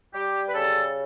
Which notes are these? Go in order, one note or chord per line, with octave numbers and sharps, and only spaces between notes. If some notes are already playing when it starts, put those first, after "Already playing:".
G3 G4
B4
C#3 A4